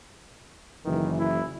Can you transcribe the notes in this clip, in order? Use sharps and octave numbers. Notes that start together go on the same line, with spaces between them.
F#1 D#3 E3
E4